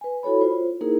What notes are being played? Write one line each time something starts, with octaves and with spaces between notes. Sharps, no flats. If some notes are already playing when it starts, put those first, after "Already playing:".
B4 G#5
E4 F#4 A4 C#5 B5
F4 C5
A#3 D#4 E4 G#4 A#4